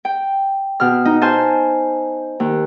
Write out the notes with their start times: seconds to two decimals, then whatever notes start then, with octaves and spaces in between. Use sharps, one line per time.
0.05 G5
0.80 B2 F6
1.05 D#4
1.21 C5 G#5 A5 F6
2.40 D#2